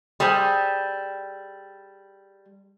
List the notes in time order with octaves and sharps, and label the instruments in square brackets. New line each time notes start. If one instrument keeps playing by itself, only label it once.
[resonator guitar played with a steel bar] G3 G#4 A4 C5 G#5